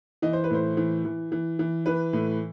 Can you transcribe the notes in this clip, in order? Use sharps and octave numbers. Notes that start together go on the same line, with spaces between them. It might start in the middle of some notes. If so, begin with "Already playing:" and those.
E3 D#5
C5
B4
A2 C5
E3
E3
E3
E3
E3 B4
A2